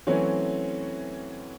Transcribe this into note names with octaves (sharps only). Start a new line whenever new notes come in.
E3 F#3 A3 C4 C#4